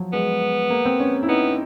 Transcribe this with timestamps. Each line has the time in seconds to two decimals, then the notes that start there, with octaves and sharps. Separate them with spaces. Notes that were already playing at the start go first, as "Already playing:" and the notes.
Already playing: F3 F#3
0.13 G#3 B3
0.70 A#3
0.85 C4
1.00 C#4
1.23 E4
1.28 B3 D#4